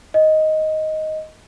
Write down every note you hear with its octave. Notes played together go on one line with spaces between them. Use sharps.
D#5